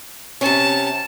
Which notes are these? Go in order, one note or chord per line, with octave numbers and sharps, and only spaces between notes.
C3 C#4 A5